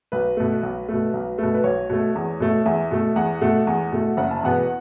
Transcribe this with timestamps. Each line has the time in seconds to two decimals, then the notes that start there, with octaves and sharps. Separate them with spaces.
0.12 B1 B4
0.37 B2 A3
0.63 B1
0.89 B2 A3
1.14 B1
1.38 B2 A3
1.54 B4
1.64 B1 C#5
1.89 B2 A3
2.15 E2
2.40 B2 A3
2.66 E2 E5
2.91 B2 A3
3.16 E2 F#5
3.41 B2 A3
3.67 E2
3.92 B2 A3
4.17 F#1 F#5
4.31 A5
4.43 E2 B2 B3 F#5